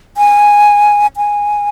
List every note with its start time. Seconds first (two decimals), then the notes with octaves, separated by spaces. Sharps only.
0.17 G#5
1.17 G#5